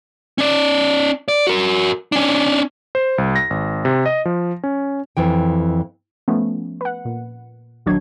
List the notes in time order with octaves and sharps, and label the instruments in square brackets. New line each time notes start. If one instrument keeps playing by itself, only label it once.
[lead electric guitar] C#4 D5
D5
F#4 A#4
C#4 D4
[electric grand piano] C5
C2
A#6
G#1
C3
D#5
F3
C#4
[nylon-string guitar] F2 E3 G5
[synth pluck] F3 A3 B3 C#4
B4 F#5
A#2
A#1 D#3 F#3 D4 C#5 G#6